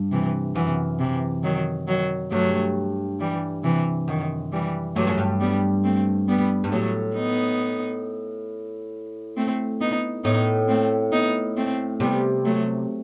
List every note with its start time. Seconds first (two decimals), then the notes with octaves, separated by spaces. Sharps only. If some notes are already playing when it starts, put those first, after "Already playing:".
Already playing: G2
0.12 C3 E3
0.55 F#2 C3 E3
0.99 C3 E3
1.44 D#3 F#3
1.88 D#3 F#3
2.32 G2 F#3 A3
3.20 E3 G3
3.64 C3 E3
4.08 F#2 D#3
4.52 E3 G3
4.95 G2 F#3 A3
5.07 F#2
5.18 G2
5.40 G3 B3
5.84 A3 C4
6.28 G3 B3
6.64 G2
6.72 A2 F#3 A3
7.16 B3 D#4
9.37 A3 C4
9.81 B3 D#4
10.24 A2 B3 D#4
10.68 A3 C4
11.12 B3 D#4
11.57 A3 C4
12.00 C3 G3 B3
12.45 F#3 A3